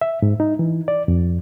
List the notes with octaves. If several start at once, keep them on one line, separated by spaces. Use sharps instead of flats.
E5
G#2
D#4
E3
D5
F2